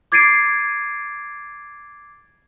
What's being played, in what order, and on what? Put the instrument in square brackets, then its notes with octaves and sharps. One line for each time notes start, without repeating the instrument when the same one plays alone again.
[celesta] D6 G#6 A6 C7 D7 D#7